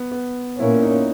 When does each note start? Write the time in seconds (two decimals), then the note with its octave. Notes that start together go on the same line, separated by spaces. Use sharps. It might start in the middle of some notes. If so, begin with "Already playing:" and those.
Already playing: B3
0.12 B3
0.59 A#2 A#3 C#4 E4
0.82 D#4